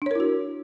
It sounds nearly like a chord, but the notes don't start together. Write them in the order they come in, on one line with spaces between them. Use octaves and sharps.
D4 C#5 A#4 E4 F#4